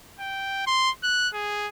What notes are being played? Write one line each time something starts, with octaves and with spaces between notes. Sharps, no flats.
G5
C6
F#6
G#4